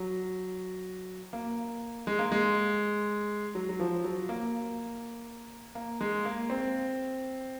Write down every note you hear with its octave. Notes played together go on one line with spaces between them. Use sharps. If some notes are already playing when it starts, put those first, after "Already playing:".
Already playing: F#3
A#3
G#3
A#3
G#3
F#3
F#3
F3
F#3
A#3
A#3
G#3
A#3
C4